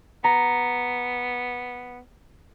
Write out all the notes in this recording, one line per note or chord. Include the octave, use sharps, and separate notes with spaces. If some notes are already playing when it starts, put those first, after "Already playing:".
B3 A#5